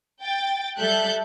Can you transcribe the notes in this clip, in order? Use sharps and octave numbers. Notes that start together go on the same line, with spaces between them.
G5 A6
G3 A4 E5 A5 F#6 G6